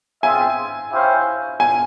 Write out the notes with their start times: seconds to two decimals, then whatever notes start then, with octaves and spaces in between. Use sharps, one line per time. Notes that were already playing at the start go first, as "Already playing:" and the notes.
0.23 C4 F4 G#4 E5 G#5
0.92 C#4 E4 G4 C5 F5
1.60 G#5